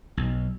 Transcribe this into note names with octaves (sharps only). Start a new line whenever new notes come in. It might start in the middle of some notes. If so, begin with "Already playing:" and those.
B1